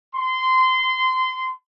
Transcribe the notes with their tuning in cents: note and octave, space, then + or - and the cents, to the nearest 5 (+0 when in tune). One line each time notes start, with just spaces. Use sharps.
C6 -20